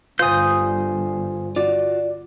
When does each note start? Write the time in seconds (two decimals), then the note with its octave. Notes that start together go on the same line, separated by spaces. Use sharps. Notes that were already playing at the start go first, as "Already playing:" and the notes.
0.19 G1 G2 F4 C5 G#5 D#6 G6
1.56 F4 F#4 D5